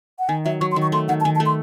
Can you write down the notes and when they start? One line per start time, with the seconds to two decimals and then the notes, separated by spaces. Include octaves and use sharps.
0.19 F#5
0.29 D#3 G#5
0.45 F#3 E5
0.61 F#3 C#6
0.72 C6
0.76 D#3
0.82 C#6
0.92 A3 C6
1.08 D#3 F#5
1.21 A5
1.25 D#3 G#5
1.36 A5
1.40 A3
1.46 C6